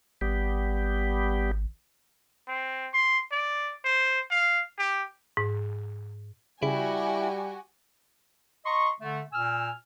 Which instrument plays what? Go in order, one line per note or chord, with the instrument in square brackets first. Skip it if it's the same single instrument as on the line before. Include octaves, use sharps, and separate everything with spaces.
[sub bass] G#1 [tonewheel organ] G3 B3 G4
[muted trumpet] C4
C6
D5
C5
F5
G4
[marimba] G#2
[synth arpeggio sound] C#3 [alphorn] G3 [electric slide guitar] E4 [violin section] F#4 G4 G#5
[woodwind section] D#5 A#5 C6 C#6
D3 A3
A#2 G#5 E6 F6